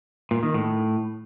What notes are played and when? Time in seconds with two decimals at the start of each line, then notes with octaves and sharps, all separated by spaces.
0.31 A#2
0.43 D#3
0.54 A2